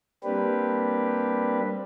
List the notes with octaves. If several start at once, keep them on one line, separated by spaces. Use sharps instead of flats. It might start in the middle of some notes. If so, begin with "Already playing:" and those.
G3 A#3 C4 D4 G4 B4